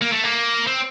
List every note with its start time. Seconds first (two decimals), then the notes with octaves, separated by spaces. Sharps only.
0.01 A#3
0.12 A3
0.23 A#3
0.67 C4